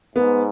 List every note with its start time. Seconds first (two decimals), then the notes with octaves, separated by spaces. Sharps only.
0.16 G#2 B3